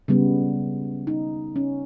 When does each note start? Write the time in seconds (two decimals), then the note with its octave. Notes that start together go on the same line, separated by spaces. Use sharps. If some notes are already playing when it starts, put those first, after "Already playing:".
0.08 C#3 G3 B3
1.07 D#4
1.56 C#4